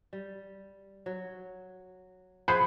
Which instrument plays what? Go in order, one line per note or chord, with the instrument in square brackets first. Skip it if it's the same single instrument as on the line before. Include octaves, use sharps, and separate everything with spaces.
[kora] G3
F#3
[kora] F3 [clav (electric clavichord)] G#4 C5 F#5 [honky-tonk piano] B5